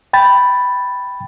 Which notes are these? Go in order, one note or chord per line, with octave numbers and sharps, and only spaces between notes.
G5 B5 A6